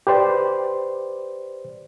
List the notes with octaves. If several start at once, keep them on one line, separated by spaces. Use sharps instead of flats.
G4 B4 C5 D5